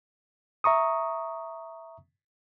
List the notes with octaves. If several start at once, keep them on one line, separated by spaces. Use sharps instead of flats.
E5 A#5 C#6 D#6